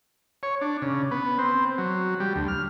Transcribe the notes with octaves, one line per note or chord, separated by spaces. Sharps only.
C#5
D4
C#3
B3
C4
F#3
G3
D2
F6